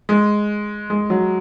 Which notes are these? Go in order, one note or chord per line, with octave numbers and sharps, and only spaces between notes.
G#3
G#3
F#3